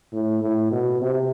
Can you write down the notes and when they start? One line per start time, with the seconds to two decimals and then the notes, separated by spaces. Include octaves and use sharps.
0.12 A2
0.42 A2
0.72 B2
1.02 C3